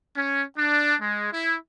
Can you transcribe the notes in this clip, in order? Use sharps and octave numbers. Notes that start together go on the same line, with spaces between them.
C#4
D4
G#3
E4